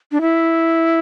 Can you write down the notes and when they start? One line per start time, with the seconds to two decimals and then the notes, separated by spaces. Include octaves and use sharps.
0.12 D4
0.21 E4